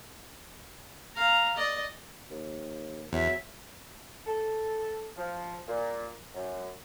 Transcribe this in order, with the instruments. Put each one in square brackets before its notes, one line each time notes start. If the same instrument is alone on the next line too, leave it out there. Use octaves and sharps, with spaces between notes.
[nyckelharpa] F5 A#5
D5 D#5
[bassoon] D#2
[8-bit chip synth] E2 [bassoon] F#3 [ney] E5
[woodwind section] A4
F3
A#2
F#2